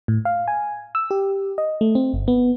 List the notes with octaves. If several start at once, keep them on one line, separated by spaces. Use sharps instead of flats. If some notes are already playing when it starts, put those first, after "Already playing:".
A2
F5
G#5
E6
G4
D#5
A3
C4
G1
B3